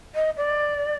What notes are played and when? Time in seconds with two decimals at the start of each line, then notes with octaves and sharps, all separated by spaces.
0.15 D#5
0.37 D5